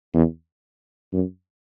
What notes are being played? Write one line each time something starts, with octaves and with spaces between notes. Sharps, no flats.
E2
F#2